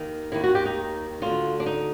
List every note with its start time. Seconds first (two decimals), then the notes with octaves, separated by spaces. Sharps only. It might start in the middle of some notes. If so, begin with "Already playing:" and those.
Already playing: D#2 D#3
0.32 D#2 D#3 E4
0.44 F#4
0.55 G4
0.65 D#4
1.22 D2 D3 F4
1.60 D4
1.66 D#4